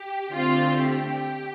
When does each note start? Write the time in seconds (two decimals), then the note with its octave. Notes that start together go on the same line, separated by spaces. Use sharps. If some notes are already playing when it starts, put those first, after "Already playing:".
Already playing: G4
0.32 D3 A3 C4 F4
0.79 G4